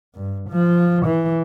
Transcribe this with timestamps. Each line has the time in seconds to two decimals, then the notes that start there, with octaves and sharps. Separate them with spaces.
0.14 G2
0.50 F3
1.05 E3